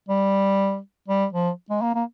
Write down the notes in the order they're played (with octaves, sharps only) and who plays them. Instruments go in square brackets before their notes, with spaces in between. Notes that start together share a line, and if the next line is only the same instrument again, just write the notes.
[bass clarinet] G3
G3
F3
G#3
A#3
A#3